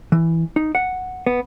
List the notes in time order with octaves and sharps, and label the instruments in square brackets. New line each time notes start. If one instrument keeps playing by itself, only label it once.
[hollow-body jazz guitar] E3
D#4
F#5
B3